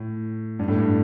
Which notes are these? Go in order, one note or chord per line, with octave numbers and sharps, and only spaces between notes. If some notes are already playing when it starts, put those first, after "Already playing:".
Already playing: A2
G2
A2
G2